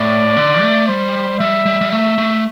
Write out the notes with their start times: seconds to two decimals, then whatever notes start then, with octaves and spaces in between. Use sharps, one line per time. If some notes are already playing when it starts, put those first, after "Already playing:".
Already playing: A2 D5
0.37 D3
0.62 A3
0.88 G3 C5
1.39 G3 E5
1.66 G3
1.81 G3
1.91 A3 E5
2.18 A3